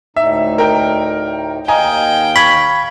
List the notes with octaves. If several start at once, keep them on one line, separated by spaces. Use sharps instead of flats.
D2 A2 D#4 E5
A#4 G5
D#2 D#5 F5 G5 G#5 A#5
B5 C#6 G#6